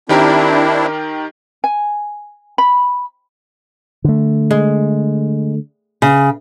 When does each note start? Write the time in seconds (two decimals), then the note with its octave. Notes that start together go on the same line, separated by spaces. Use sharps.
0.09 D#3 C4 D4 E4 G4 A#4
1.64 G#5
2.58 B5
4.04 D3 A3
4.51 G#3
6.02 C#3